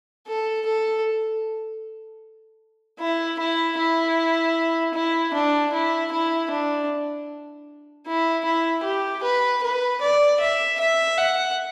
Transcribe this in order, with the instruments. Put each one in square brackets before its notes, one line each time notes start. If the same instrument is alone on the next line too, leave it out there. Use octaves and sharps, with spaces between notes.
[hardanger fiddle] A4
A4
E4
E4
E4
E4
D4
E4
E4
D4
E4
E4
G4
B4
B4
D5
E5
E5
F#5